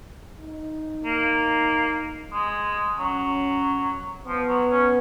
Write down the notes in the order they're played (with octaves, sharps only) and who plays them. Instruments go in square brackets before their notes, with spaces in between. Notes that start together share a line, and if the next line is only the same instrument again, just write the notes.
[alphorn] D#4
[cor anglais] A#3
G#3
[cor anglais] F#3 [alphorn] C#4
[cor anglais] F3 [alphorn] B3
[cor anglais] F#3
C#4